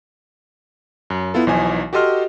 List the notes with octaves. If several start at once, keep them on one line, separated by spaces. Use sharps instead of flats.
F#2
B3 E4 F4 A4
B1 E3 F3 D#4 G#5
F#4 G4 A4 D#5 C6 F6